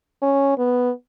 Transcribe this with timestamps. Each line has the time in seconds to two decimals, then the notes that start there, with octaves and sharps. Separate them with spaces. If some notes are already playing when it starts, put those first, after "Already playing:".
0.22 C#4
0.58 B3